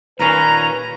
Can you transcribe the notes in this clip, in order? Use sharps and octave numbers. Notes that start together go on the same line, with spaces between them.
D#2 A#2 C#4 B4 A#5